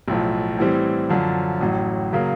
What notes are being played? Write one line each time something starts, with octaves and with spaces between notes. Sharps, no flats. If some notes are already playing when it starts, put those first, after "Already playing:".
B1 A2 F3
A2 E3 G3 C4
F#2 D3 F3
A1 A2 F#3
C#3 F#3 A#3